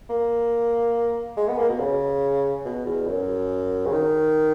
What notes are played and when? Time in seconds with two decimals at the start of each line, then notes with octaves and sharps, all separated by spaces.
0.10 A#3
1.37 G#3
1.48 B3
1.58 A#3
1.69 B2
1.80 C#3
2.65 B2
2.86 E2
3.07 F#2
3.86 C#3
3.92 D#3